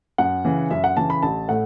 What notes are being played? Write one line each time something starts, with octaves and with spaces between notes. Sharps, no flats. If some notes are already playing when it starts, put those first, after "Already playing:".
F#2 F#5
C#3 E3
F#2 E5
F#5
C#3 E3 A5
B5
A1 A5
A2 A3 F#5